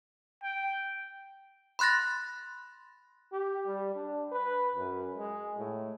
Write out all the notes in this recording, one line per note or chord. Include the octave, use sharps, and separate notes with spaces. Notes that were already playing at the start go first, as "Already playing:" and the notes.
G5
B5 C6 F#6 A6 A#6
G4
G3
D4
B4
F#2
G#3
A2